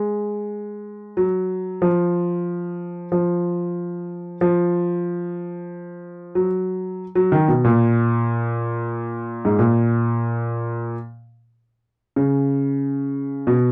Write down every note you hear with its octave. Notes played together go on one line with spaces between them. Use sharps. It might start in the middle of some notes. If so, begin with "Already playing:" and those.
Already playing: G#3
F#3
F3
F3
F3
F#3
F#3
D#3
B2
A#2
G#2
A#2
C#3
B2